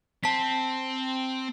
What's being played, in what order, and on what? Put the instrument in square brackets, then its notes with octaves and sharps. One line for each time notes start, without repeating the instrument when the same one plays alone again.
[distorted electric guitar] C4 [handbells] A5 B6